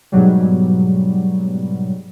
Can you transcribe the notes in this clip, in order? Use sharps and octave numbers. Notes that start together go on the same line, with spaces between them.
G#2 B2 F#3 G3